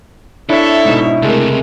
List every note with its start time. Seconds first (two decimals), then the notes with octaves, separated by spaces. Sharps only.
0.50 D4 E4 A4 C#5 E5
0.85 G#2 B2
1.22 C#2 C3 G#3 A3 A#4